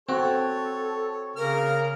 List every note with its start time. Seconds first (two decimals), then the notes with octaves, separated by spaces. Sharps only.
0.09 C4 F#4 A4 C#5
1.36 C#3 A#3 A#4 F6